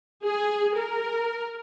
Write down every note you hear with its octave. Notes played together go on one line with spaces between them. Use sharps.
G#4
A#4